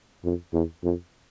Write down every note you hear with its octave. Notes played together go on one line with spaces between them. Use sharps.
F2
E2
F2